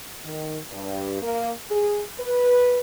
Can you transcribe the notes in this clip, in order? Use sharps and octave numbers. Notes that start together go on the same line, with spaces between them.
D#3
G2
A#3
G#4
B4